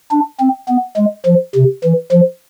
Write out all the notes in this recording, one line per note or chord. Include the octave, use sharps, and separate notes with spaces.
D4
C4
B3
G#3
F3
C3
E3
F3